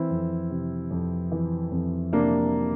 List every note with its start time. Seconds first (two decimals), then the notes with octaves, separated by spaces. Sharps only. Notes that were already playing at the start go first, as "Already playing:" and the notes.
Already playing: E3 C4 E4
0.10 F2
0.50 C3
0.91 F2
1.32 E3
1.71 F2
2.12 C3 A#3 D4